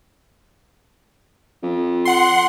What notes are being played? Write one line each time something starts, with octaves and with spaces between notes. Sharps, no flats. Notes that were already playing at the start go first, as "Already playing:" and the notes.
F2
F#5 C6